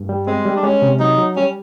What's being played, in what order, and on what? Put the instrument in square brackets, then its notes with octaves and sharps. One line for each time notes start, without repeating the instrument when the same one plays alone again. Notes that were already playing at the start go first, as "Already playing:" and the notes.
Already playing: [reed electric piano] G2
G3
[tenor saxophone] G#3 [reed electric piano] C4
[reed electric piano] G3
[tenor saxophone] D4
[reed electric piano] G#3 [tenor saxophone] C#4
[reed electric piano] C3
[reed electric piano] F#3 [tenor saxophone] D#4
[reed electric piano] F#3
[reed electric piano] G3 [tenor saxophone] C#4